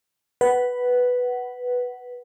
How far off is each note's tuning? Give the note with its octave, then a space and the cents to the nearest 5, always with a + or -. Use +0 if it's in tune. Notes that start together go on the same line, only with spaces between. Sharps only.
B4 +0 F#5 +15